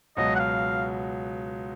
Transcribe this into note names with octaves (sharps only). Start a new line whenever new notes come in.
C#2 B2 F#3 D#5
F#5
F5